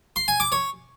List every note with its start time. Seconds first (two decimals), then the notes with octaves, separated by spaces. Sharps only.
0.16 C6
0.28 G#5
0.40 D6
0.52 C#5